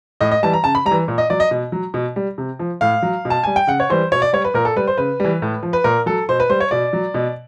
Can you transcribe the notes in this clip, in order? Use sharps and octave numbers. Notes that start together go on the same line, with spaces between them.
A2 D#5
D#5
E3 G3 A5
A#5
C#3 A5
B5
G3 A#5
E3
A#2
D#5
F#3 D5
D#5
B2
F#3
B2
G3
C3
F3
A2 F5
F#3
B2
A5
G3 G#5
G5
C#3 F#5
C#5
E3 G3 C5
B2 C#5
D5
G3 C#5
B4
A#2 A#4
A4
G3 B4
C5
C#3 B4
E3 G3
A2
F3
B4
A#2 A#4
F#3 A4
B2 C5
B4
G3 C5
C#5
B2 D5
F#3
B2